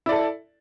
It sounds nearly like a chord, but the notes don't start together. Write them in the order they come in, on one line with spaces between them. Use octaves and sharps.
E4 D5 A4